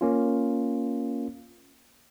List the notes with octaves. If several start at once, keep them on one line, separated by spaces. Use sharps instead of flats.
A#3 C#4 F4